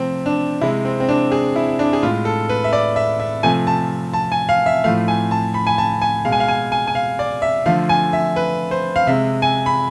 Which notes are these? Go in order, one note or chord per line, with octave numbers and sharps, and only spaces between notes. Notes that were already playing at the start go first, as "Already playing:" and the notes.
Already playing: C3 F3 A3 C4
D4
C3 G#3 E4
C4
C4
D4
G#4
E4
D4
G#4
A2 G#3 F4
A4
B4
E5
D5
E5
E5
C3 F3 A3 G#5
A5
A5
G#5
F5
E5
A2 F3 A3 F5
G#5
A5
B5
G#5
A5
G#5
B2 G#3 F5
G#5
F5
G#5
G#5
G#5
F5
D5
E5
D3 F3 A3 F5
G#5
E5
B4
C5
F5
C3 G#3 E5
G#5
B5